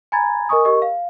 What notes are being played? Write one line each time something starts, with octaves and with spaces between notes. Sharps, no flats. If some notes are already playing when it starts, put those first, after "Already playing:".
G#5 A#5 B5 G#6 A6
A#4 D#5 G#5 C#6 D#6
G4 A#4 D#5 C#6
F5